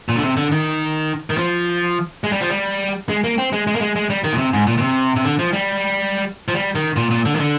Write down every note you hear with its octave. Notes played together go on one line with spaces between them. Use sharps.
A#2
D3
C3
D3
D#3
D#3
F3
G#3
G3
F3
G3
G#3
A#3
C4
G#3
G#3
A#3
G#3
G#3
G3
D#3
A#2
C3
G#2
A#2
A#2
C3
C3
D3
F3
G3
F3
G3
D#3
A#2
A#2
D3
D#3
D3